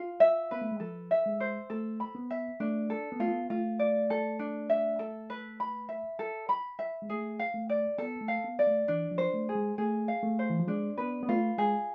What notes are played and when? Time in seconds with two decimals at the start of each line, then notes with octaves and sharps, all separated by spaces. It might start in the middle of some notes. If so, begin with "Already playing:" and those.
Already playing: F4
0.20 E5
0.51 B3 B4
0.61 A3
0.71 G#3
0.80 F3 A4
1.11 E5
1.26 G#3
1.40 C5
1.70 A3 A4
2.00 B5
2.15 B3
2.30 E5
2.60 A3 D4
2.90 A4
3.12 B3
3.20 A3 F4
3.27 B3
3.50 A3 F4
3.79 D5
4.10 A4
4.39 D4
4.70 E5
4.99 A4
5.30 B4
5.60 B5
5.89 E5
6.19 A4
6.49 B5
6.79 E5
7.02 G#3
7.09 A3 G#4
7.39 F5
7.54 A3
7.69 D5
7.98 B3 A4
8.21 A3
8.28 F5
8.44 B3
8.59 D5
8.67 A3
8.88 E3 D4
9.11 F3
9.18 C5
9.34 A3
9.49 G#4
9.55 G#3
9.78 A3 G#4
10.08 F5
10.23 A3
10.39 C5
10.50 E3
10.60 F3
10.68 G#3 D4
10.98 B3 B4
11.23 B3
11.29 A3 F4
11.58 G#3 G#4